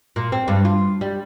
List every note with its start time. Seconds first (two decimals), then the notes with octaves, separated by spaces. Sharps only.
0.16 A#2
0.32 C4
0.48 G2
0.65 F4
1.01 G3